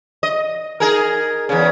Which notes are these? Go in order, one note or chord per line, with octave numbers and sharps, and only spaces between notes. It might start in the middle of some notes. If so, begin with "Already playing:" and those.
D#5
D#4 G#4 A#4
E2 C#3